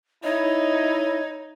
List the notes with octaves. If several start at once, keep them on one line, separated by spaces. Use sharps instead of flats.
D#4 E4 C#5 D#5